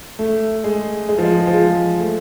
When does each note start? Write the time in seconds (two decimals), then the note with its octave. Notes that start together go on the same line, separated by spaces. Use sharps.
0.19 A3
0.64 G#3
1.09 G#3
1.18 F3
1.24 G#3
1.47 F3
1.54 G#3
2.00 A3